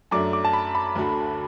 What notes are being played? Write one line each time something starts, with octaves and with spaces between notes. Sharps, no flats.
F#2 F#3 A3 D4 D6
D6
A5
B5
B5
D2 D3 A3 F#4